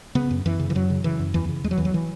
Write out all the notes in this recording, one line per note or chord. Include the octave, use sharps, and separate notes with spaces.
C#3 B3
F#2
F#2 E3
C#3
E3
F#2 F#3
C#3
C#3 E3
F#2
E2 E3
C#3
E2 G#3
F#3
E2 E3
F#3
E3